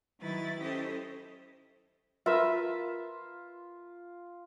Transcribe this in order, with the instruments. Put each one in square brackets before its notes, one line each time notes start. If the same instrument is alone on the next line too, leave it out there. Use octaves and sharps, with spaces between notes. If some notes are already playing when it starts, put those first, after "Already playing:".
[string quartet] D#3 F#3 E4 B4 A6
C#4 E4 G4 A4 C5 D#5
[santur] F4 [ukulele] A#4 B4 [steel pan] E5